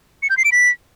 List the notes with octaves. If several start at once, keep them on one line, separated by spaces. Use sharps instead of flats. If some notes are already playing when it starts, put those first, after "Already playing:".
C#7
G6
C7
D7
B6